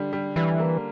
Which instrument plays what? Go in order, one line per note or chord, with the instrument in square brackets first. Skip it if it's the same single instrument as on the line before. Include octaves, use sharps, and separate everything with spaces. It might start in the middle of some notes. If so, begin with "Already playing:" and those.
Already playing: [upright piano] D3 G3
G3
[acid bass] E3 [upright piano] G3
[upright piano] A#3